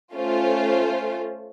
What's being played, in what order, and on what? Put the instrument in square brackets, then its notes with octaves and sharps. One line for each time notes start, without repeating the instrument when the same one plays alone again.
[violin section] A3 C#4 F4 C5